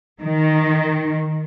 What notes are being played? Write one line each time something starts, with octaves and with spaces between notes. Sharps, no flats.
D#3